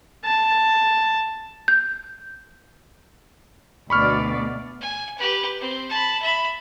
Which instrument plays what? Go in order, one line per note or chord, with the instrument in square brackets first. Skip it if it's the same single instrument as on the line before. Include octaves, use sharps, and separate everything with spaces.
[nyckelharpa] A5
[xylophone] G6
[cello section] D2 B2 D5 [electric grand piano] B5 C#6 F6
[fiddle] G#5
G4 B4
C4
A5 B5
E5 B5